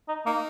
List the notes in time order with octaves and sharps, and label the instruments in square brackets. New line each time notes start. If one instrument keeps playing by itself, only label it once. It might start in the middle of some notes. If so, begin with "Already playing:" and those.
[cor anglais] D#4
[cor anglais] A#3 [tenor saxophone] D#4